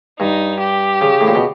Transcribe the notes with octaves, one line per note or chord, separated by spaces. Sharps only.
G2 D#4
G4
C#3
A2
A#2
B2